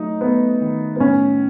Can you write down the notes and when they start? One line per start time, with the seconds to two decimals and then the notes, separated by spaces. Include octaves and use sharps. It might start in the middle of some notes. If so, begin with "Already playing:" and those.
Already playing: F#3 A3 D#4
0.21 A3 B3
0.61 D#3
0.96 B3
1.00 A2 C#4